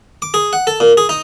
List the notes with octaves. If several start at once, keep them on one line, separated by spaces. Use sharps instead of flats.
D6
G#4
F#5
A4
A#2
G#4
D#4